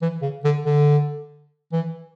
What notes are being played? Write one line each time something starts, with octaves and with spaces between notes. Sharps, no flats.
E3
C#3
D3
D3
E3